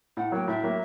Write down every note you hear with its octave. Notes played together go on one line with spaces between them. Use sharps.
A2 F#5
F#3 A#3 G5
A2 E5
F#3 A#3